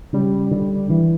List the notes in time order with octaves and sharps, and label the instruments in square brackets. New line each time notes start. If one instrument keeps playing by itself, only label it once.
[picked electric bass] C#3 [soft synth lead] G3
[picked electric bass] D3
E3